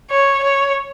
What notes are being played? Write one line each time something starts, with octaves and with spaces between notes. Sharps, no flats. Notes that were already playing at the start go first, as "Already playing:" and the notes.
C#5
C#5